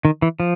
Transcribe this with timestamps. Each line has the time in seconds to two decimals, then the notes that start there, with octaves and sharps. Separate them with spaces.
0.05 D#3
0.22 E3
0.40 F3